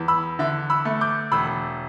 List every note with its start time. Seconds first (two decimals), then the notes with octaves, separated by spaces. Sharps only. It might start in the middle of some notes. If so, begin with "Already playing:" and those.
Already playing: E2
0.08 B5 E6
0.39 D3 E5
0.70 B5 E6
0.85 A3
1.01 D6 G6
1.32 E1 B5 E6